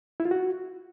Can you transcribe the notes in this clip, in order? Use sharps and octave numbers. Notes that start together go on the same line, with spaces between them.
E4
F4
F#4